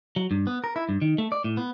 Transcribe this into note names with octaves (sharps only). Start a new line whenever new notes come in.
F#3
G2
B3
A#4
E4
G2
D#3
A3
D5
A2
B3